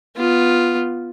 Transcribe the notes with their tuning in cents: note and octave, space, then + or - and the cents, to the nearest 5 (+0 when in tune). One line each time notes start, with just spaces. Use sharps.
B3 +0 F4 +0